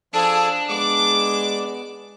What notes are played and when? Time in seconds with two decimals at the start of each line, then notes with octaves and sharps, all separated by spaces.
0.14 F3 D4 G#4 A4
0.70 G#3 B3 D6